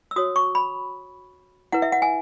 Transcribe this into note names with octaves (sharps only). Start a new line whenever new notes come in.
E6
F#4 C#5 D#6
C#6
B5
E4 B4 F#5
E5
F#5
G#5